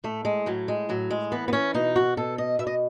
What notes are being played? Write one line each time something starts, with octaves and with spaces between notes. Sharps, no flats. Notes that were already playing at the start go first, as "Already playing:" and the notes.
A2 A3
G#3
A2 F#3
G#3
A2 F#3
G#3
E3 B3
B3
C#4
B2 D#4
F#4
B2 A4
D#5
B2 E5
D#5